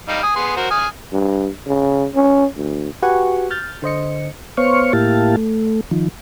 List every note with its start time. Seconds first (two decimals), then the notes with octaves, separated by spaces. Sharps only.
0.08 G3 D#4 F5
0.23 G#5 D#6
0.36 B3 G#4 C6
0.56 F#4 A#4 C5
0.71 G#5 D#6 F6
1.13 G2
1.67 C#3
2.15 C#4
2.56 D2
3.03 F#4 G4 B4 F#5 G#5 C#6
3.51 F6 G6 A6
3.82 D3 C5 D#5 C#7
4.57 B3 C5 C#5 F5 C#6
4.93 A2 A#3 E4 G4 F5 A5
5.37 A3
5.91 D#3 F3